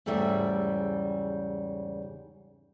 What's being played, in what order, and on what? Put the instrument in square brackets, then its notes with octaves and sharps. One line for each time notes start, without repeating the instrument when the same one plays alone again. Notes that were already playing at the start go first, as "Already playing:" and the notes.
[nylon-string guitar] E2 G#2 C#3 G3 A3 E5